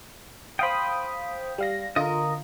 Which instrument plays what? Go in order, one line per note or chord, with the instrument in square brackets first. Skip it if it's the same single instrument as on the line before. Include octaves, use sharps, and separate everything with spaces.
[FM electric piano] C5 F5 D#6 [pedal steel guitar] G5 B5
[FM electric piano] G3 F5 A#6
[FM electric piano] D3 F4 [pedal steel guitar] A#4 D#5